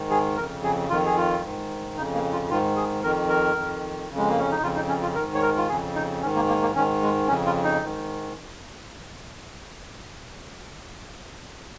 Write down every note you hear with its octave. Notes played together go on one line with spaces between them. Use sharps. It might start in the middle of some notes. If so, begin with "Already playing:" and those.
Already playing: G#2 D#3
G#4
F2 C#3 A#4
G#4
F2 D#3 F4
G#4
F4
G#2 D#3
F2 C#3 D#4
A#3
F4
G#2 D#3 F4
G#4
F2 D#3 A#4
A#4
F2 D#3
F2 C#3
G#3
A#3
C#4
D#4
F2 C#3 F4
D#4
C#4
F4
G#2 D#3 A#4
C#5
A#4
F4
F2 C#3 G#4
D#4
G#2 D#3 C#4
A#3
A#3
A#3
G#2 D#3 C#4
G#3
F2 C#3 C#4
F4
D#4
G#2 D#3